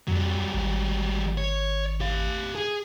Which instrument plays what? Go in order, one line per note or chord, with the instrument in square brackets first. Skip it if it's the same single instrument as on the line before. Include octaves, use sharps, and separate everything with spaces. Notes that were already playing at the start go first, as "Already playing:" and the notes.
[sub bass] F2 [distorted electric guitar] F#3 G3
[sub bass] G#1
[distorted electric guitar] C#5
G4 F5
G#4